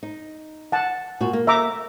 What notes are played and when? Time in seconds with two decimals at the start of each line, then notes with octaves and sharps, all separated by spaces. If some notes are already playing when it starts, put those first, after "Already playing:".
0.03 D#4
0.72 F#5 A5
1.20 A#2 F#4
1.33 A#3
1.47 E5 A#5 D6